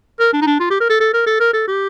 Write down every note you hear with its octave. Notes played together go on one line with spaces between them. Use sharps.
A#4
D4
D#4
D4
F4
G4
A#4
A4
A4
A#4
A4
A#4
A4
G4